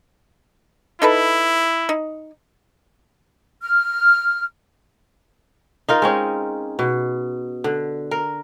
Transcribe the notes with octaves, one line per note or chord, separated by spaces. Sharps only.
D#4 E4 A4 B4
D#4
F6
D#4 F4 A#4
G#3 C4 C#4
B2
D3
A#4